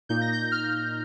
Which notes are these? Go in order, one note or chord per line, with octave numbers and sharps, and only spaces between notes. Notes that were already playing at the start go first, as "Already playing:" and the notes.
A#2 A#3 D#4 G6
A#6
G6
F6